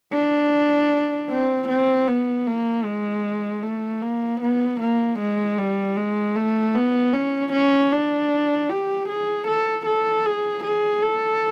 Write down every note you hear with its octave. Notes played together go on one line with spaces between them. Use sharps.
D4
C4
C4
B3
A#3
G#3
A3
A#3
B3
A#3
G#3
G3
G#3
A3
B3
C#4
C#4
D4
G4
G#4
A4
A4
G#4
G#4
A4